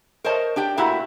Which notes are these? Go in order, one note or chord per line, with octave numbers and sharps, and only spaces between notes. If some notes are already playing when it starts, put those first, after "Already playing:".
A#4 C5 C#5 D#5 A5
D4 G4 G5
A#2 A3 E4 F#4 G4